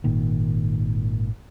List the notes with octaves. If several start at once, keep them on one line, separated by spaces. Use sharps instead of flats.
G#1 A#2 D#3